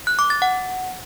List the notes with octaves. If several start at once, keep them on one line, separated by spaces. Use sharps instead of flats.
F#6
D6
A6
F#5